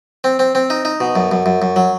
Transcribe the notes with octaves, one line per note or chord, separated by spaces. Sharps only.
C4
C4
C4
D#4
D#4
B2
F#2
F#2
F#2
F#2
F#3